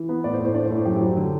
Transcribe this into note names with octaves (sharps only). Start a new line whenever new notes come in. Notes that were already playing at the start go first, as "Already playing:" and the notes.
Already playing: E3
B3
A2 D5
C5
A2
C5
D4 D5
C5
A2
F#2 G4
F#3
D3